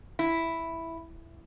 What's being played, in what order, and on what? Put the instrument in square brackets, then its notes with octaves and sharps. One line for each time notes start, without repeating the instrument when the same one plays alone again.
[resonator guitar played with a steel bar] E4